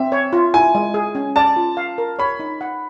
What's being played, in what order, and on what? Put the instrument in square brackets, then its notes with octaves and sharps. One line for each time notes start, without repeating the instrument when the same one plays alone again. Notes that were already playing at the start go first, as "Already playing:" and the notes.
Already playing: [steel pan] C4 [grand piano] E5
[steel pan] C#5
F4
[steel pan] E4 [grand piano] G#5
[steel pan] G#3
G#4
C#4
[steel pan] D5 [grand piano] A5
[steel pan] F4
F5
A#4
[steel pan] C#5 [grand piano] B5
[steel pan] D#4
F#5